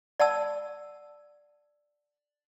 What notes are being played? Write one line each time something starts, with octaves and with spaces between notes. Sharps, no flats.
D5 F#5 A5 E6